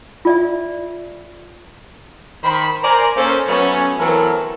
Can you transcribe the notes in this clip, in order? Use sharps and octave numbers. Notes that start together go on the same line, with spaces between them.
F4 D5 E5
D#3 C5 B5
A#4 C5 D5 G#5 A#5
A#3 C#4 A4 C5
F#3 A3 B3 C#4
E3 F#3 B3 C4 A4 A#4